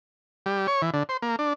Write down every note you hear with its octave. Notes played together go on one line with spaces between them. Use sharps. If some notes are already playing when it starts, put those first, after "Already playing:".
G3
C#5
E3
D3
C5
A#3
D4